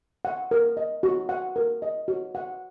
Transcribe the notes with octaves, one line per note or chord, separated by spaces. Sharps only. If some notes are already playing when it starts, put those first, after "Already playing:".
F#5
A#4
D#5
F#4
F#5
A#4
D#5
F#4
F#5